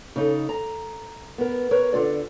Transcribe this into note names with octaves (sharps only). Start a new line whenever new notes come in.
C#3 D#4 A4
A#5
B3 A#4
A#4 B4 C#5
D3 F4 D5